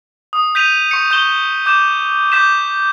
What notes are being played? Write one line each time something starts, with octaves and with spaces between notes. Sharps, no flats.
D#6
G6 B6 D#7 F7
C#6 C#7
C#6 G6 E7 G7
D6 G6 E7
D6 G6 B6 E7